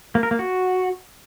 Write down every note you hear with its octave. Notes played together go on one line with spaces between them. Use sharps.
A#3
A#4
A#3
F#4